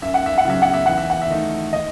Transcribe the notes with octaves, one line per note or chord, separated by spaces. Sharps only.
F#2 E5
F#5
E5
F#5
C#3 F#3 E5
F#5
E5
E2 F#5
E5
F#5
E5
D#3 A3 D#4
D#3 D#5